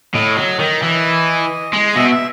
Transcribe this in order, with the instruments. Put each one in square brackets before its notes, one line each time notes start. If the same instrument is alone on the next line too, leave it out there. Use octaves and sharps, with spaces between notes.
[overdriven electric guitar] A2 [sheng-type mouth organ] D#5
[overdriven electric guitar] F#3
D#3
E3
G#3
[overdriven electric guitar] B2 [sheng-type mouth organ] E5
[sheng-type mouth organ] E5